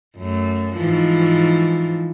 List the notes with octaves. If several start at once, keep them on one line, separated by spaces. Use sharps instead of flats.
F#2 A3
G#2 E3 F3